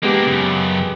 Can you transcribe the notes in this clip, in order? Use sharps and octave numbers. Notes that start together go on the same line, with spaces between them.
G#3 A#3 B3 D4 G4
F#2 C#3